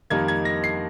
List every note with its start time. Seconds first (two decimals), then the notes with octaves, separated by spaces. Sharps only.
0.10 F2 D#3 G3 A#3 D#4 G#6
0.28 G#6
0.45 A#6
0.64 C7